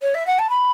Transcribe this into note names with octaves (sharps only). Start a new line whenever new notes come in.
C#5
E5
F#5
A5
B5